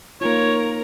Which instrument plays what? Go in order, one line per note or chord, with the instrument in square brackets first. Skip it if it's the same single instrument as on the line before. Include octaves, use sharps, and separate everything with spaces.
[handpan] A#3 D#4 F4 [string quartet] A#4 [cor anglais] C#5